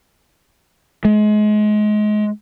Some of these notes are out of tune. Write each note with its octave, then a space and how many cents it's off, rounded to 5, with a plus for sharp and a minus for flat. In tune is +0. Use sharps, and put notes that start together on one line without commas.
G#3 +30